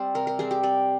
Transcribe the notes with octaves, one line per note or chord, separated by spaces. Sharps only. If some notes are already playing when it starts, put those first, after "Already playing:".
Already playing: G3 C4 C5
C3 A#4
A#4
G3 C4 G#4
G4
C3 D5